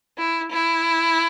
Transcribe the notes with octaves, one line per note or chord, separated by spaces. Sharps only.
E4
E4